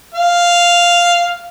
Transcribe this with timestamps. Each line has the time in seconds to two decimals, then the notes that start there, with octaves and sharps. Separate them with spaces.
0.14 F5